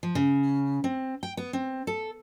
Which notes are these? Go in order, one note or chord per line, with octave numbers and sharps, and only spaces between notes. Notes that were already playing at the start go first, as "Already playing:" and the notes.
F3
C#3
C4
G5
B3
C4
A4